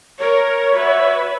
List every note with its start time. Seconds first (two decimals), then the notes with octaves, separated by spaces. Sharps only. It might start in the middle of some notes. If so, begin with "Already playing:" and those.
0.19 A#4 C#5
0.74 F#4 B4 E5